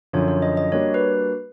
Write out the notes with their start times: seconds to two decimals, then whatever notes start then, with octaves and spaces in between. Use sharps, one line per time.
0.13 F#2 D3 F3 C#5
0.28 C#5
0.42 D#5
0.57 D#5
0.72 G3 A#3 D4 F#4 C#5
0.94 B4